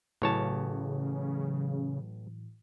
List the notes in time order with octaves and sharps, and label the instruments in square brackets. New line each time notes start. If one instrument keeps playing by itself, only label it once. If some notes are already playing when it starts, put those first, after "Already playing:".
[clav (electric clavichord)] A1 C#5 A5 [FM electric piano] A2 E3 F#3 [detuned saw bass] C#3